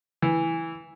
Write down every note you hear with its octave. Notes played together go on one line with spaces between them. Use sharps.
E3